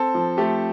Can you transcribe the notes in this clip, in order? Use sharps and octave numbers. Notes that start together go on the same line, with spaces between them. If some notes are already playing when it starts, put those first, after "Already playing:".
Already playing: C4 A4
F3
A3 G4